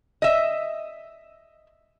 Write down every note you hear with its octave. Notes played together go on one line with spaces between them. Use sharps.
D#5 E5